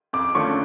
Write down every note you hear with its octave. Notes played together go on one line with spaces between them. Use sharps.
F2 D6
D3 F3 A3 C#4 C#6